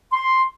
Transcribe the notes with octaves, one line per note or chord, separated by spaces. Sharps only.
C6